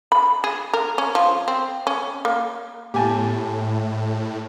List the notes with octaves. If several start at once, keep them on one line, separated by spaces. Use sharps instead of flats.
B5
G#4
A#4
C#4
F3
C4
C#4
A#3
A2 G4 G#5 A5